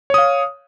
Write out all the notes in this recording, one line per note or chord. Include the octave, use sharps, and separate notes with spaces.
C#5 F5 D#6